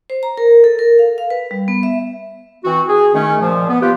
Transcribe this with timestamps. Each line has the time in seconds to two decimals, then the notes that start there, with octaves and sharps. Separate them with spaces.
0.10 C5
0.23 A#5
0.38 A#4
0.64 A4
0.79 A#4
0.99 F5
1.18 F5
1.30 B4
1.51 G3
1.68 B3
1.83 E5
2.64 E3 C4 F#4
2.88 G#4
3.14 D#3 A3 C#4
3.41 A#2 F3
3.69 B3
3.81 F4 G4 B4